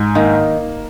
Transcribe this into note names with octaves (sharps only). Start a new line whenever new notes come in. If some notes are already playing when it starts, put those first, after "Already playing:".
Already playing: G#2
D#3 A#3